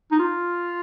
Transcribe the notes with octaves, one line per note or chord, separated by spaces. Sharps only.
D#4
F4